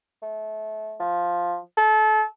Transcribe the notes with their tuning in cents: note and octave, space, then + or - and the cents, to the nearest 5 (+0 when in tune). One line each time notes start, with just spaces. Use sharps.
A3 -30
F3 +5
A4 -30